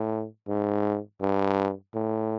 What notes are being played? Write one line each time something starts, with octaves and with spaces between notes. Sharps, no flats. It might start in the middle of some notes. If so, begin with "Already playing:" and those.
Already playing: A2
G#2
G2
A2